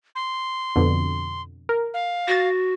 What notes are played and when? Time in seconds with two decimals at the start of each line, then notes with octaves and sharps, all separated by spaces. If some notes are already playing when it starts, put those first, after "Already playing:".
0.15 C6
0.76 F2 B2 D3
1.69 A#4
1.94 F5
2.28 F#4 A6 A#6